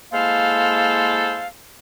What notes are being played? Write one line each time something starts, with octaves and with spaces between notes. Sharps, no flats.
G#3 A#3 E4 A4 C5 F5